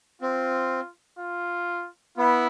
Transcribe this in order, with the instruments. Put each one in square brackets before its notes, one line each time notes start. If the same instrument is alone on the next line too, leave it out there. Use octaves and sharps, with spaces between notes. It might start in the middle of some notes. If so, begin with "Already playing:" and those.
[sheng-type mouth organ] C4 [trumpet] F4
[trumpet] F4
[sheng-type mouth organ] B3 [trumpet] E4